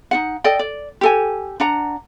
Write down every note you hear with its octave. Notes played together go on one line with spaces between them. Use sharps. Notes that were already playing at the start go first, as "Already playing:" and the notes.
D#4 F4 F#5
A4 D5 D#5 G5
D5
G4 A4 G#5
D4 F#5 A#5